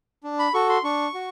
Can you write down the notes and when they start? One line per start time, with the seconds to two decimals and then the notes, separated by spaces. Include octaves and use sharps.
0.24 D4
0.39 B5
0.54 F#4 A4 C#6
0.69 C6
0.84 D4 C#6
1.14 F#4